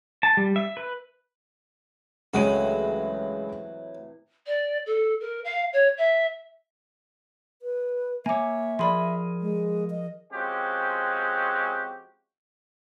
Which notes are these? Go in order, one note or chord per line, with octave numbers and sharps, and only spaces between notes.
A5
G3
E5
B4
C#2 A2 C3 E3 F#3 G#3 F#4 D#7
D5
A4
A#4
F5
C#5
E5
B4
A#3 C#5 E5 G#5 D6
F3 G#4 A#4 D5 B5 C6
G#3
D#5
F3 G#3 C4 C#4 F#4 G4